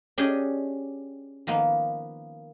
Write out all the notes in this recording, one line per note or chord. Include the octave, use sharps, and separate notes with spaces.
C#4 D4 G4 G#4 D5 D#5
D#3 F3 A#3 B3